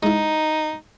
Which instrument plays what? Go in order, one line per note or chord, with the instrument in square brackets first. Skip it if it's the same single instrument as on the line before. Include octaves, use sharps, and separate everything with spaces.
[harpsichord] G#3 E4 [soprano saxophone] D#4